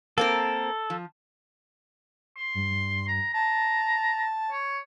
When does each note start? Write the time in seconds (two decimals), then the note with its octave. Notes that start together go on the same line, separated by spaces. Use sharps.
0.18 A#3 C4 A4 A#4
0.90 F3
2.37 C6
2.55 G2
3.08 A#5
3.34 A5 A#5
4.51 C#5